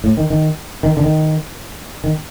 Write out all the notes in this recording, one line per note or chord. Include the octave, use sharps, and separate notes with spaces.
A2
D#3
D#3
D#3
D3
D#3
D#3